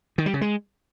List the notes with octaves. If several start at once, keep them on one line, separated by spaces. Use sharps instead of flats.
D#3
G3
C#3
G#3